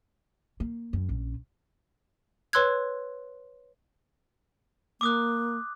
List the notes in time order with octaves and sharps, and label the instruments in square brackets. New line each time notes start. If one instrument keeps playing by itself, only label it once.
[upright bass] A#3
F#2
A#1 C#4
[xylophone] B4 C#5 C6 E6 F#6 G#6
[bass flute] A#3 [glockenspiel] D6 D#6 F#6